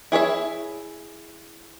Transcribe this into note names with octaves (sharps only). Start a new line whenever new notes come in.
E4 G#4 C#5 E5